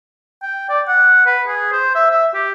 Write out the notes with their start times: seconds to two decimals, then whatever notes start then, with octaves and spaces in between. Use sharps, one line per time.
0.42 G5
0.69 D5
0.88 F#5
1.26 B4
1.47 G#4
1.72 C5
1.95 E5
2.10 E5
2.34 G4